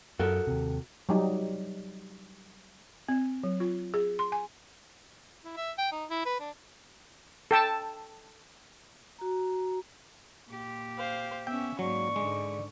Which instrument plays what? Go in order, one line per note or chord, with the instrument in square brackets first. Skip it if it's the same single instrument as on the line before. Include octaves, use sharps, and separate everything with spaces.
[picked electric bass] F#2 [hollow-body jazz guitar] F#4 A4 A#4
[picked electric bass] D#2 C3
[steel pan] F#3 G3 D#4
[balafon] C4
F#3
F4
G#4
C6
G#5
[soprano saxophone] E4
E5
G5
D#4
E4
B4
D4
[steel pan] A4 G5 A5
[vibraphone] F#4 A#5
[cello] A#2 G4
[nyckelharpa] C5 F5
[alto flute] B3 [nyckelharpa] C#4 E5 [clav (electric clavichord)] G5
[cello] G#2 A#3 [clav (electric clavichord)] F#3 [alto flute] D5 [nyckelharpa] C#6
[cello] G#2 D3 [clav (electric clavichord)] G#3